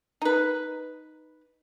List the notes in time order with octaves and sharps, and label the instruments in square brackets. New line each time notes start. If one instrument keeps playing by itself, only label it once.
[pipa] D#4 B4